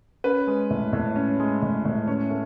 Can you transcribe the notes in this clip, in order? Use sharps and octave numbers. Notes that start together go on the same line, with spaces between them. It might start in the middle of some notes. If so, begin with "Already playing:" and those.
C#4 B4
G#3
A2
A2
C#4
G#3
A2
A2
C#4 C#5
A3